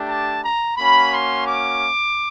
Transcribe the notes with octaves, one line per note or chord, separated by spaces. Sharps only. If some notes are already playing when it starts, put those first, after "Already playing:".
Already playing: A3 D4 G4
A5
A#5
A#3 C#4 F#4 B5
C6
D6